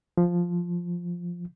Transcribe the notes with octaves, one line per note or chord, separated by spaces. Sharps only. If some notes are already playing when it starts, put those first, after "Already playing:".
F3